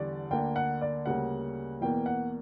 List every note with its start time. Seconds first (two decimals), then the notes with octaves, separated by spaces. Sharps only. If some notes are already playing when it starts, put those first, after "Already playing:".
Already playing: E2 D3 G3 D5
0.31 D2 D3 A#3 G5
0.56 F#5
0.81 D5
1.06 D2 C#3 G3 A#3 F#5
1.81 E2 B2 A#3 G5
2.06 F#5